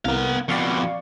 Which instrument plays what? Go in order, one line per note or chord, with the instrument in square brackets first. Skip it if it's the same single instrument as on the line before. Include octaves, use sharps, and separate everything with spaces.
[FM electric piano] C2 A#3 [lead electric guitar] B3 F5
[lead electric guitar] F2 B2 [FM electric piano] D5 F5 C#6